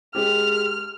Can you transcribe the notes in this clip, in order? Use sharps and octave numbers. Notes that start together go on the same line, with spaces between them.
G#3 G4 F6